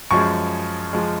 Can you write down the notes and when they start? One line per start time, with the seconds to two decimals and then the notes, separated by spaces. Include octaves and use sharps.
0.11 F#2 F3 G#3 C#6
0.93 F3 G#3